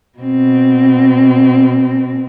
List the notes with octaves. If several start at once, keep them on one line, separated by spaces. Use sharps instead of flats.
B2 C4